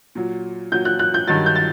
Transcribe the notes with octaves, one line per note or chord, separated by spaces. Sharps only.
A#2 F#3
A#2 F#3 G6
F#6
F#6
G6
G2 D#3 F#3 A6
G6
A6